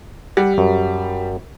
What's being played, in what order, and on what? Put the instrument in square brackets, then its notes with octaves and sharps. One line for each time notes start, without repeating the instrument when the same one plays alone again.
[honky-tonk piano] G3 [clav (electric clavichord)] F#5
[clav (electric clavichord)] F#2